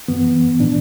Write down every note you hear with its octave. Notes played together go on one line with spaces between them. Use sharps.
F#2 E3 B3
A2 E3 D4